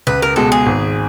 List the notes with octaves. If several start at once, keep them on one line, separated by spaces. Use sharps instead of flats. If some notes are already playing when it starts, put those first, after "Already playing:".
C#2 B4
A#4
B2 G#3 A4
G#4
G#1